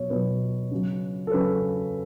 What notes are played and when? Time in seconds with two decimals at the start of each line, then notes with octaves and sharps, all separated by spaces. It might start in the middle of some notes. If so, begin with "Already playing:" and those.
Already playing: B2 F#3 C#5
0.10 B2 F#3 B4
0.71 C#3 F#3
1.27 A4
1.32 C#3 F#3 B4